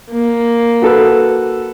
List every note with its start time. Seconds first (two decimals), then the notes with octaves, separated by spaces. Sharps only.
0.11 A#3
0.82 F#4 A4 B4